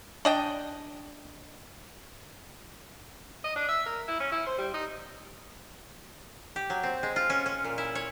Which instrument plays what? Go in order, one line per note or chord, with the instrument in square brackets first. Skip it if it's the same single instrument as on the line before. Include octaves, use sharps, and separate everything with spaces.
[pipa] D4 D#5 G5
[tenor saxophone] D#5
D4
E5
A#4
E4
C#4
E4
C5
G3
D#4
[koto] G4
F#3
C4
G#3
F4
C#4
C#4
A#2
E4
C#5